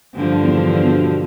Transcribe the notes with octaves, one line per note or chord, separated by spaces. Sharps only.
G2 D3 F3
E2
B2